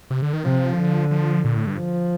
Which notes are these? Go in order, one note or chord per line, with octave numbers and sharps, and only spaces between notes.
C3
D3
D#3
C3 F3
D3
F3
A#2
A2
G2
F3